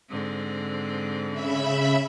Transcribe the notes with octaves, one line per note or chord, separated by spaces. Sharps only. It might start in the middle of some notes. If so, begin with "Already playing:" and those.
G#2 D3 C4
C#3 E5 B5